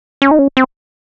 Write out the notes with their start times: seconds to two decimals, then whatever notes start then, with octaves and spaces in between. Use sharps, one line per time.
0.22 C#4
0.31 D#4
0.39 C#4
0.57 C4